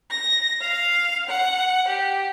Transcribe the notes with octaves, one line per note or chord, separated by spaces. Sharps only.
A#6
F5
F#5
G4